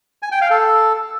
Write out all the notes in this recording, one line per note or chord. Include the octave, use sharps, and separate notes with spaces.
G#5
G5
F5
A4